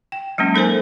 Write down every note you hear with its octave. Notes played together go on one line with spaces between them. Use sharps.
G5
F#3 G#3 A#3 C#4
D#4 A4 A#4 C5 G#5